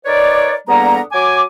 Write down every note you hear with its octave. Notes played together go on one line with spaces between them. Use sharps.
D#4 A#4 B4 C#5 D5
E2 D3 G3 A#3 B3 A#5
F#3 G#5 D6